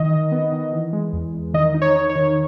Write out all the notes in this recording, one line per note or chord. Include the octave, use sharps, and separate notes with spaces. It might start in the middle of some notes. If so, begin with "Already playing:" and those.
Already playing: D#3 D#5
D#3
B3
D#3
E3
G#3
E2
E2
D#3 D#5
D#4
C#5
D#4
C#5
D#3